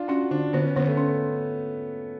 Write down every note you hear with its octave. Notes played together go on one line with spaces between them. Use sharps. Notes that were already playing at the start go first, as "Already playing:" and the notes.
Already playing: D4 F4
C#4 F#4
D3 D4
D3 B3
C#4
D3 B3
A3
C#4